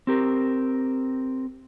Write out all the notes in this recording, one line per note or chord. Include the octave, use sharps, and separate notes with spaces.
C4 G4 A#4